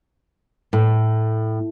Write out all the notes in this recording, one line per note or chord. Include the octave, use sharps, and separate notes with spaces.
A2